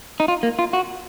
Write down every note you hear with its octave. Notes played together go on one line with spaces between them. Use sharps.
D#4
F4
A#3
F4
F#4